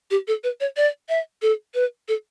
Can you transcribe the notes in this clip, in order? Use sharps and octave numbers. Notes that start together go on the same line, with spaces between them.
G4
A4
B4
C#5
D5
E5
A4
B4
A4